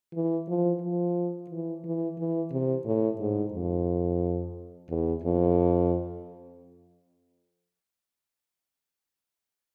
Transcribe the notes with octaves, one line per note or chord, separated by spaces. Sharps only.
E3
F3
F3
E3
E3
E3
C3
A2
G#2
F2
E2
F2